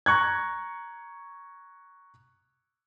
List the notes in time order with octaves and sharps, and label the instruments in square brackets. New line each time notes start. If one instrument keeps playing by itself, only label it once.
[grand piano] A#5 C#6 F#6 G#6